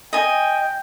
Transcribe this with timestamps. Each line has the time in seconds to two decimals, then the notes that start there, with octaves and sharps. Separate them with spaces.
0.13 D#5 G5 G#5